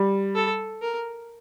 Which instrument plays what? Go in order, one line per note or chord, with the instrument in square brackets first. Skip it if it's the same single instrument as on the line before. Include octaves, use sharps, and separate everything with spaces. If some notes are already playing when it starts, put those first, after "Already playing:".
Already playing: [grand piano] G3
[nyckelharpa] A4
A#4